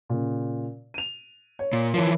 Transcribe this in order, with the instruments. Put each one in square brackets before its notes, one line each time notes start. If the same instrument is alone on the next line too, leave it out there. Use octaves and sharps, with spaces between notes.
[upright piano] A#2 C#3
D#7 F7
C#5
[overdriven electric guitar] A#2
[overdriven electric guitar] E3 F3 [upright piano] A#4 C#5 A5